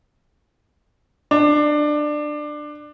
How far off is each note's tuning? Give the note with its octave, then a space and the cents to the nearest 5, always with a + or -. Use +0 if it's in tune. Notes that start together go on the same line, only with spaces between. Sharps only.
D4 +20